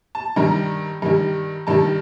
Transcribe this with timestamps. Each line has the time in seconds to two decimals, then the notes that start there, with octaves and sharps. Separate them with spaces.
0.15 A5
0.36 G2 D#3 G3 A#5
1.02 G2 D#3 G3
1.67 G2 D#3 G3 A5